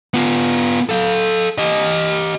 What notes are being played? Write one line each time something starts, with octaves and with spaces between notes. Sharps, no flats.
B3 F4
A4 F5
G4 D#5